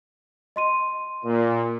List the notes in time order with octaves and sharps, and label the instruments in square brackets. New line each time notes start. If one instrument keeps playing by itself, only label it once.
[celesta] D#5 C6 D#7
[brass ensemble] A#2